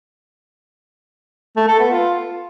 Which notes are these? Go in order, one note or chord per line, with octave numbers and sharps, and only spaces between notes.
A3
A4
B3
F4